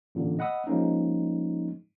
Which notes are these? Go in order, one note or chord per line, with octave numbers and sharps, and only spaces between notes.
A1 A#2 D3
D#5 F#5 B5 D#6 E6
F3 G#3 A#3 C#4 D#4